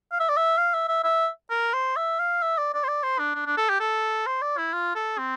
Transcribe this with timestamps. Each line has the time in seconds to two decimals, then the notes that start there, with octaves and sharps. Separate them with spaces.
0.12 F5
0.20 E5
0.29 D5
0.37 E5
0.58 F5
0.74 E5
0.88 E5
1.04 E5
1.50 A#4
1.74 C5
1.96 E5
2.19 F5
2.42 E5
2.58 D5
2.74 D5
2.84 C5
2.88 D5
3.03 C5
3.19 D4
3.35 D4
3.46 D4
3.58 A4
3.70 G4
3.80 A4
4.27 C5
4.42 D5
4.58 E4
4.73 F4
4.95 A4
5.18 C4